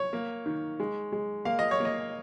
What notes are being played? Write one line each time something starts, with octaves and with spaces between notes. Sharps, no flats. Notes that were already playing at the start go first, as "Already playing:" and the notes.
Already playing: C#5
A#3
D#3
G#3
G#3
A#3 F5
D#5
C#5
A#3
D#5